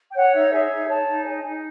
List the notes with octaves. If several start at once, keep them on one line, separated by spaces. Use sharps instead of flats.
G5
C#5 F#5
D#4 E5
G#4 E5
D#4
C#5 A5
D#4
G#4 G#5
D#4 G#5